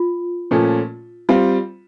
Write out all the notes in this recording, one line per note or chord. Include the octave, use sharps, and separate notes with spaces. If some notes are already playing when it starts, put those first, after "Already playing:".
Already playing: F4
A#2 F3 A3 C#4
G3 C4 F4